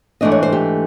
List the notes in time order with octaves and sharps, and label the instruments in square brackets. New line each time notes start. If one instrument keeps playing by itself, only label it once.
[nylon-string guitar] G#2 E3 A3 D4 D#5
C#5
C5
G4